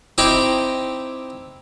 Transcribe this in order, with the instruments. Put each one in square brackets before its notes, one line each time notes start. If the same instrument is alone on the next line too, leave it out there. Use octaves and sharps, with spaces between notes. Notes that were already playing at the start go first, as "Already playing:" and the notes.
[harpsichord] C4 D#4 E4 G4 G5